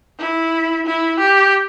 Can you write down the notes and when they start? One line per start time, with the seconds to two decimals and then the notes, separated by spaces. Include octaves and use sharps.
0.19 E4
0.86 E4
1.20 G4